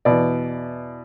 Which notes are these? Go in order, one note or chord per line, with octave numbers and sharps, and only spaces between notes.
E2 B2 D5